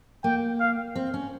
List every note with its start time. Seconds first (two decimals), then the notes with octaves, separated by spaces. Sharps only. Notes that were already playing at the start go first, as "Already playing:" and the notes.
0.24 A#3 G5
0.60 F5
0.96 C4
1.14 C#4